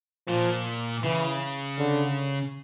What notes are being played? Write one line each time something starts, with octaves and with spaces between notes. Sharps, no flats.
A#2 F3
C#3 E3
D3